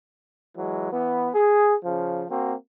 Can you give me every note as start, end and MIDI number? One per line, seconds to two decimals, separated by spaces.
0.56 0.90 52
0.56 0.90 54
0.56 0.90 56
0.91 1.29 52
0.91 1.29 59
1.34 1.75 68
1.84 2.24 49
1.84 2.24 53
2.29 2.53 58
2.29 2.53 60
2.29 2.53 66